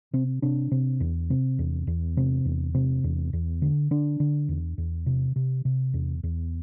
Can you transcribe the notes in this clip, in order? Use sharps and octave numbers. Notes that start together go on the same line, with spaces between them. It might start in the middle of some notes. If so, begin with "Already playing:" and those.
C3 C4
C3 D4
C3
E2
C3
E2
E2
C3
E2
C3
E2
E2
D3
D3 D4
D3
E2
E2
C3
C3
C3
E2
E2